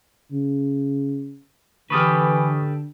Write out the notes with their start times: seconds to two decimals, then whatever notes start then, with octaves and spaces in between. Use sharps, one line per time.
0.31 C#3
1.90 D3 E3 G4 A4 B4 C#6 D#6 F6